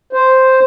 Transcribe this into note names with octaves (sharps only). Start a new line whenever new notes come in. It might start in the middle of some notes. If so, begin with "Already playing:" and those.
C5